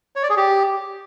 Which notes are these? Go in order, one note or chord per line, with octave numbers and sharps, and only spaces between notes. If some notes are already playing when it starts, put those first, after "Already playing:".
C#5
D5
G#4
G4